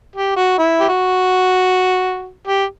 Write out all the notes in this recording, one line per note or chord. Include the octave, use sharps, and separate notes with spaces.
G4
F#4
E4
G4
F#4
G4